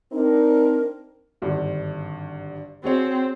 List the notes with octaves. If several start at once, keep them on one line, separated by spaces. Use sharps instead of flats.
C4 D4 D#4 A#4
G#1 G2 D3
C4 F#4 G#4 C#5